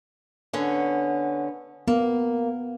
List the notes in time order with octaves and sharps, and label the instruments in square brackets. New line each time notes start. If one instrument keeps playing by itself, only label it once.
[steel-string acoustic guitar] D3 B3 C#4
[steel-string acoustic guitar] A#3 [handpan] B3